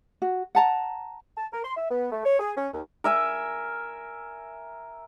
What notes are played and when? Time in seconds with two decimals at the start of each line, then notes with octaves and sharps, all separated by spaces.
0.22 F#4
0.55 F#5 A5 A#5
1.37 A5
1.52 A#4
1.63 C6
1.76 E5
1.90 B3
2.12 A3
2.25 C#5
2.40 G#4
2.56 C#4
2.72 D#2
3.04 A#4 E5 G#5